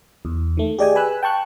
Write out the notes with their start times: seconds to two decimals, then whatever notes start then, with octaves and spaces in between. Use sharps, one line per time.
0.25 E2
0.57 D#3 A3
0.79 G4 G#4 D5 D#5 G5 G#5
0.95 B4 G#5 B5 E6 F#6
1.23 G5 A5 C#6 F#6